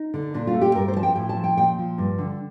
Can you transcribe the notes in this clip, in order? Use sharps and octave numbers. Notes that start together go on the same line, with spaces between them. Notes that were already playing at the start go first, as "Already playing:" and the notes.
Already playing: D#4
D3
A#2 D4
F4
A3
G4
G2 A#4
C5
F3 A5
G5
A2 G5
A5
F3
G5
A#2 G5
F3
G2
D3